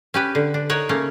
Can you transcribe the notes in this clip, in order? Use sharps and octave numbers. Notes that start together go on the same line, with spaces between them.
C#4 G4 B4
D3
D4
D#4 A#4 C#5 F#5
C#3 A3 A#3 C#4